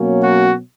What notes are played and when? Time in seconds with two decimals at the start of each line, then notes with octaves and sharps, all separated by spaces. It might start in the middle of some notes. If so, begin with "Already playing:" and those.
Already playing: B2 F#3 A#3 C#4
0.22 F#4